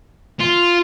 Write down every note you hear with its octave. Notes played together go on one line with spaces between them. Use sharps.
F4